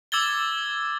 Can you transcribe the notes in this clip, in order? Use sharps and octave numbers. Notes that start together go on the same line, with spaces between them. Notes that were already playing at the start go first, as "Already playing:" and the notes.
D6 E6 G#6 A6 G7